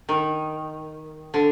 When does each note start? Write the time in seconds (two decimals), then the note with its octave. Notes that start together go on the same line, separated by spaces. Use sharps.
0.09 D#3
1.34 D3